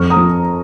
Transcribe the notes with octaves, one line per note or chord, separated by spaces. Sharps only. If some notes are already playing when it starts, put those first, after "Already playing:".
Already playing: F2 C#6 F6
A#5 D#6
F3